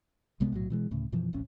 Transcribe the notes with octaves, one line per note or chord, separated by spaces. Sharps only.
C2 C3 G#3 B3
B1 A2 F#3
B2 E3 G#3
D2 A2 C#3
F#2 B2 E3 F3
D1 A1 C#4